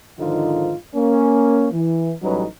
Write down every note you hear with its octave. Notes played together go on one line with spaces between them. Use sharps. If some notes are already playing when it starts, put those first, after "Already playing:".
G#2 D3 D#3 F3 D#4 F4
A#3 C#4
E3
A1 F#3 G3 C#4 D#4 B4